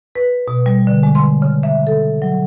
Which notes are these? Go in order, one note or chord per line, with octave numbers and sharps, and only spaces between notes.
B4
B2
G3
D3
G#3
C6
C#3
E5
A4
F#3